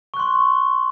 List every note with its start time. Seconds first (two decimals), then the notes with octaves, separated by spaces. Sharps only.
0.14 C#6
0.17 F#6
0.20 C6